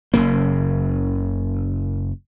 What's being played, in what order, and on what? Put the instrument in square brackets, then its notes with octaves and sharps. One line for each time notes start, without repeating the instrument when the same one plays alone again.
[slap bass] F#1 C#3 A#3